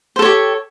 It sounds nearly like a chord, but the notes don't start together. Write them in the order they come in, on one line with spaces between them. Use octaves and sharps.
C5 A4 C#5 G4